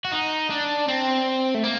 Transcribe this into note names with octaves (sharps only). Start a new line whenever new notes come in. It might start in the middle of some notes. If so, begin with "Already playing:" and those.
F#4
D#4
D4
C4
A3
A#3